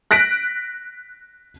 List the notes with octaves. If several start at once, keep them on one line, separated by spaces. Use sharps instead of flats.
F#6 A#6 B6 D7